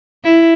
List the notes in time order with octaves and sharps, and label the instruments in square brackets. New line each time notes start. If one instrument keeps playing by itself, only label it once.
[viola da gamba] E4